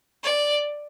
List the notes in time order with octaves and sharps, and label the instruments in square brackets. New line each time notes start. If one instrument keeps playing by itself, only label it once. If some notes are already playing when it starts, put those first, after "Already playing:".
[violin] D5